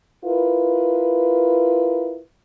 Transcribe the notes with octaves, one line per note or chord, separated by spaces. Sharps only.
E4 F4 A#4 B4